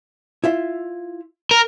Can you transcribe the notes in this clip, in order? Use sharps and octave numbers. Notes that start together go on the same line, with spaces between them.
E4 F4 E5
A#4